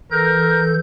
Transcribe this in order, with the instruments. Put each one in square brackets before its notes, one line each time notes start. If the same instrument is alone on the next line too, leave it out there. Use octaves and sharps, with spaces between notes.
[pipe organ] E3 A4 G6 [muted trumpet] A#4